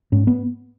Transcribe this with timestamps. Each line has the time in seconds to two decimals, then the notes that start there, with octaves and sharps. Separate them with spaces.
0.12 G#2 C#4
0.27 B3